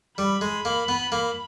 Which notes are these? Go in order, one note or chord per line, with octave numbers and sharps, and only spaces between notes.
G3 B5
G#3
A#3
B3
A#3